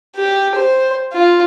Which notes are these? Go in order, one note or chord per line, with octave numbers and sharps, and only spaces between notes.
G4
C5
F4